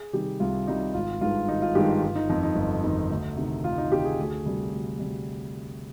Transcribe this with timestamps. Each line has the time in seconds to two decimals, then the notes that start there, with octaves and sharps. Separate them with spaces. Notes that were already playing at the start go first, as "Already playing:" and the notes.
Already playing: G#4
0.13 C3 D#3 G3 G4
0.40 C2 F4
0.67 C3 D#3 G3 D#4
0.94 G#1 F4
1.21 G2 D#3 G#3 F4
1.48 G#1 D#4
1.62 F4
1.75 G2 D#3 G#3 G4
1.89 F4
2.02 G1 F4
2.16 D#4
2.29 F2 D#3 D#4
2.43 D#4
2.56 G1
2.84 F2 D#3
3.10 D2
3.37 C3 D#3
3.64 D2 F4
3.78 D#4
3.91 C3 D#3 G4
4.05 G#4
4.19 D2
4.45 C3 G3
4.72 D2
4.99 C3 G3